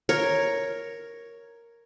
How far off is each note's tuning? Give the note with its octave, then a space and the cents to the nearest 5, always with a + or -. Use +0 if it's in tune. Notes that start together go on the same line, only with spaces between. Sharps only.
A#4 +0 C#5 +0